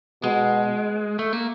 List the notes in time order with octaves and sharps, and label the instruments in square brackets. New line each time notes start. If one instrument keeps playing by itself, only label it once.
[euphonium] B2 [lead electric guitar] G#3
[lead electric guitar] A3
A#3